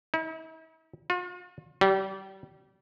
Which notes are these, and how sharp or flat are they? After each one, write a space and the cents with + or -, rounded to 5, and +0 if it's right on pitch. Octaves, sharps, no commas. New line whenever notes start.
E4 -45
F4 +45
G3 -30